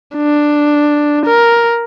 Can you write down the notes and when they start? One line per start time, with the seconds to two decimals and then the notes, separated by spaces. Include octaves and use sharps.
0.16 D4
1.26 A#4